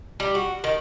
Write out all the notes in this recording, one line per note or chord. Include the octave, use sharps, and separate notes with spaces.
G3
F#4
D#3